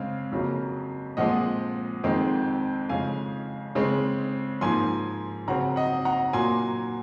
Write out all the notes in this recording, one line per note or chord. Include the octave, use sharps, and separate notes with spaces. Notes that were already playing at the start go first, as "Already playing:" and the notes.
Already playing: C#3 G#3 C4 F5
F2 C#3 F#3 A#3
A#2 F3 G#3 C4 D#5 F#5
F2 D#3 G#3 C4
F2 C#3 G#3 F5 G#5
C#3 G#3 C4
G#2 F3 A#3 G#5 C6
C#3 F#3 C4 F#5 A#5
D#5 F#5
F#5 A#5
A#2 F#3 A#3 G#5 C6